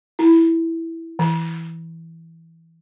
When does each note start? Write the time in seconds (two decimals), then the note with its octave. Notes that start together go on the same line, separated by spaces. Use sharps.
0.19 E4
1.19 E3